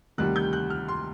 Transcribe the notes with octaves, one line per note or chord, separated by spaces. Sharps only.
D2 C3 D#3 G3 F#6
G6
F#6
F6
C6